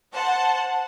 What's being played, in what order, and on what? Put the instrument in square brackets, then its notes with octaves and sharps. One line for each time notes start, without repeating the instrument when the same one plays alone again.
[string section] C5 F#5 A5